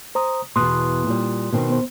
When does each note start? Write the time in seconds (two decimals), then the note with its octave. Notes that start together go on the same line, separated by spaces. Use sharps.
0.15 C5 A#5 D#6
0.56 E2 B2 C6 D#6 F#6
1.07 A#2 G3
1.52 B2 D#3 C4
1.70 B3 C5